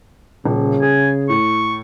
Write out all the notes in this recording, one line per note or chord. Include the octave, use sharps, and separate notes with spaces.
D#1 C#3
G#4 G#5
A2 C#6